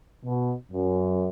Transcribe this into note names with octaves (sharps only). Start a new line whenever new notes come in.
B2
F#2